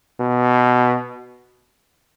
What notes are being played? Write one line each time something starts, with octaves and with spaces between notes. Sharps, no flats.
B2